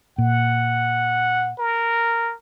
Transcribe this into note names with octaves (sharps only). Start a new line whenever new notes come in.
A#2 F#5
A#4